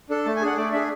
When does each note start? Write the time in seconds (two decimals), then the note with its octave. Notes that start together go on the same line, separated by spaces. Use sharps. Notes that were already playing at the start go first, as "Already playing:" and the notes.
0.10 D4 A4
0.26 A3 A5
0.36 G#5
0.42 D4 G#4 F#5
0.57 A3 D5
0.72 D4 G#4 E5